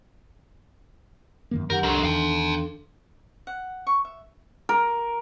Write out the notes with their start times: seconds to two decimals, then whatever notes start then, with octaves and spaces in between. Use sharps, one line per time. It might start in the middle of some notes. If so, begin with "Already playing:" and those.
1.51 F#2 D#3 A#3
1.70 F#2 D#3 G4 A#4 F#5
1.83 C2 D#3 F#3 D4 A4 C6
2.03 E2 D#3 F5 G5
3.47 F#5
3.87 C#6
4.05 E5
4.69 A#4